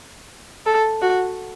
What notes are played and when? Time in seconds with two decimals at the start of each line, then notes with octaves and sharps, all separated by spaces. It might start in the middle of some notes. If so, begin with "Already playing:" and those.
0.66 A4
1.02 F#4